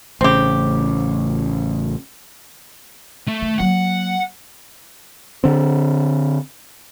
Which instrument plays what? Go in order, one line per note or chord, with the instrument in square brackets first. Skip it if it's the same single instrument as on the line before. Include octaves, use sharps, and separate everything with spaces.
[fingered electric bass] A1 C#3 [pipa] C4 G4
[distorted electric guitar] A3
[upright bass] D#3
[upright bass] F#3 A#3 [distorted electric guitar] F#5
[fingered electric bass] D3 C4